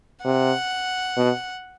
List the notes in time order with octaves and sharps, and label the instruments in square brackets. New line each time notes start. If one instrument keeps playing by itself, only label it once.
[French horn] C3 [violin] F#5
[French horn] B2